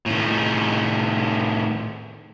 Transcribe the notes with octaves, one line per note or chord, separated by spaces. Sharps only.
A2 D#3